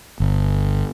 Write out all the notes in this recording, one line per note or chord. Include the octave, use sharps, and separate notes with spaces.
G1